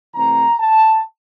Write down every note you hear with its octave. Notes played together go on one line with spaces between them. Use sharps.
C3 E3 A3 C4 A#5
A5